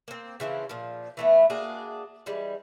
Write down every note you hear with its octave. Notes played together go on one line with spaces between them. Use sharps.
A#3 C4
C#3 E3 F3 C4
A#2 F3
E3 A3 B3
A#3 D4 F#4 G#4
E3 G3 G#3